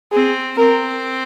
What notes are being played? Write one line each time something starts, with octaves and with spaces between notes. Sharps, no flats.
C4 G#4
C4 A#4